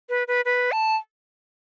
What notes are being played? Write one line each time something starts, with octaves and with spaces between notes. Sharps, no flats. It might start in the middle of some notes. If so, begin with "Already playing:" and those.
B4
B4
B4
A5